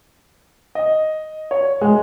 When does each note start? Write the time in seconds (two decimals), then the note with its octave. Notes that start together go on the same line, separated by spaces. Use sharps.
0.75 D#5
1.51 C#5
1.81 G#3